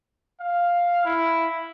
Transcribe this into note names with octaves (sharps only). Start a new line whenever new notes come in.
F5
E4